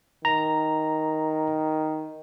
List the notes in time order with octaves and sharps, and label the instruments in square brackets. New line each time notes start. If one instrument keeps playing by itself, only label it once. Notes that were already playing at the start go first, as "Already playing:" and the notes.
[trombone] D#3 [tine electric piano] A#5